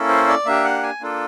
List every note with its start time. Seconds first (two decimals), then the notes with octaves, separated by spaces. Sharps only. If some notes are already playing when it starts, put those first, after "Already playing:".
Already playing: A#3 C#4 E4 A4
0.09 C5
0.28 D5
0.46 A#3 D4 G4 E5
0.64 F#5
0.83 G#5
1.01 A#3 D4 F4 A4